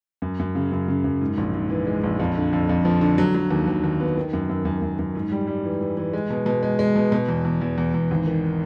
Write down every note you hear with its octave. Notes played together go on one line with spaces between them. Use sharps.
F#2
F#2
C#3
F#2
C#3
F#2
G#2
A#1
G#2
E3
G#3
A#1
F2
D3
F2
F2
F3
D3
F#3
F#3
D#2
D#2
D#2
B3
D#3
F#2
F#2
F#2
F#2
F#2
G#2
G3
G3
E3
E3
E3
G#3
B2
B2
G#3
G#3
B2
B2
E2
E2
E2
E2
E2
G#1
D#3